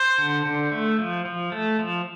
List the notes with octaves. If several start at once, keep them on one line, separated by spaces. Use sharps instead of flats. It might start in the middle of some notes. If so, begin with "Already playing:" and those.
Already playing: C5
D3
D3
A3
F3
F3
A3
F3